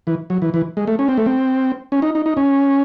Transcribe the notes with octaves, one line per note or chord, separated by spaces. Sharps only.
E3
F#3
E3
E3
G#3
A3
C#4
C4
A3
C4
C#4
D#4
D#4
D#4
C#4